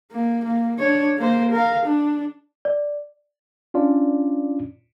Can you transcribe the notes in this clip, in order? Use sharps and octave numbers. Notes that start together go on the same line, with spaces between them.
A#3
A#3
D4 C#5
A#3 C5
A#4 F5
D4
D5
C#4 D4 F4 D5